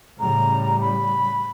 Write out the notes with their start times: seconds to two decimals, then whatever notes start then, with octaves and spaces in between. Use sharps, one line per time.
0.20 A2 C#3 G3 A#5
0.81 B5